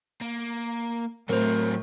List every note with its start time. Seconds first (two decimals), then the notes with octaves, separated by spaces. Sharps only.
0.22 A#3
1.29 A2 F#3 C4 A#4 C5